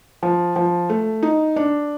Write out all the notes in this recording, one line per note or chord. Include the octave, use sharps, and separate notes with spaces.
F3
F3
A3
D#4
D4